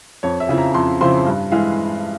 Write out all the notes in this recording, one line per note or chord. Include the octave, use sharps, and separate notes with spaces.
F2 C#5
E5
C#3 F3 C4 E4
A#5
F2 C6
C#3 F3 C4 E4 C6
G2
E3 G#3 E4 F5